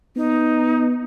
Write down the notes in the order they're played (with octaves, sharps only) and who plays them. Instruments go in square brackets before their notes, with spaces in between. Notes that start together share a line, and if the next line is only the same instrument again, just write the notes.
[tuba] B3 [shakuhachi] D#4